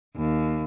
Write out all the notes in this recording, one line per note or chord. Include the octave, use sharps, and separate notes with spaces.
D#2